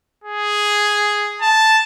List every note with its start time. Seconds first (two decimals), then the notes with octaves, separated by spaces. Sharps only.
0.24 G#4
1.41 A5